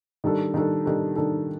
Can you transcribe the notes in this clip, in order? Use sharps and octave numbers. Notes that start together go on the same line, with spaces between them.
D#3 G3 D4 A4
D#3 G3 D4 A4
D#3 G3 D4 A4
D#3 G3 D4 A4